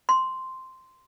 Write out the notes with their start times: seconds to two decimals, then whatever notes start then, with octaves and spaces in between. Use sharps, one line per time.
0.09 C6